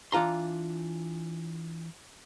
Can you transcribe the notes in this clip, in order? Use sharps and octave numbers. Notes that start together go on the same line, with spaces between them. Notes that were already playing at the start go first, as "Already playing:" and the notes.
E3 D4 F4 A#5 C6